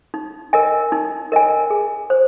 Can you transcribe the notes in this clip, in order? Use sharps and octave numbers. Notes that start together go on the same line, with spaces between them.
D#4
A#4 D#5 G#5
D#4
A#4 D#5 G#5
G#4
C5